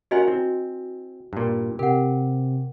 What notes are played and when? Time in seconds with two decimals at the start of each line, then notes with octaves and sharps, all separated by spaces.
0.11 C#4 F#4 A#4 D#5 F#5 G#5
0.28 C4 E4
1.33 G2 A#2
1.79 C3 G4 A#4 F#5